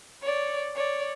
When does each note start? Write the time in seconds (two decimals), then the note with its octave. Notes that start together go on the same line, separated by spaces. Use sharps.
0.22 C#5 D5
0.75 C#5 D5